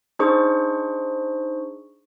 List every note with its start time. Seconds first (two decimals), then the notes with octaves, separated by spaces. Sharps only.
0.19 D4 D#4 G#4 C5 C#6